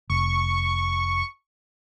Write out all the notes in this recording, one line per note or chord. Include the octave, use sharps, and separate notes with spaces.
F1 C#6